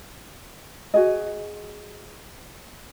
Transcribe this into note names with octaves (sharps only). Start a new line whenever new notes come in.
F#4 G#4 D#5